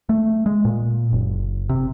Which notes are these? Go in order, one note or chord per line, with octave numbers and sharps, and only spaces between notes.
A3
G#3
A#2
F#1
C3